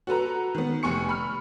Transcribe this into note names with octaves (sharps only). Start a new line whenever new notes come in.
F#4 A4 B4 A#5
D#3 B3
F1 G#5 C#6 C#7
B5 F6